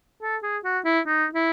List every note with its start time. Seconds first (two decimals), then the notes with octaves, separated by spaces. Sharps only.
0.22 A4
0.43 G#4
0.64 F#4
0.85 E4
1.07 D#4
1.35 E4